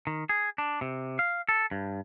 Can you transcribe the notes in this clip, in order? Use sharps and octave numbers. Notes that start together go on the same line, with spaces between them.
D#3
G#4
D4
C3
F5
A4
G2